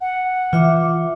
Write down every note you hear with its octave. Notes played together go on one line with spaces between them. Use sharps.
F#5
E3 F4 E5 D6